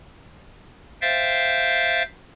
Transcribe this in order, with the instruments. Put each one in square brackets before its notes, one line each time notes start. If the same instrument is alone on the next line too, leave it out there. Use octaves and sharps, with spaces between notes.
[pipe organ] C5 E5 F5 G5 A6